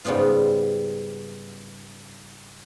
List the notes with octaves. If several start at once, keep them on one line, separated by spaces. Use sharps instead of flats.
G#2 C#3 G3 B3 F4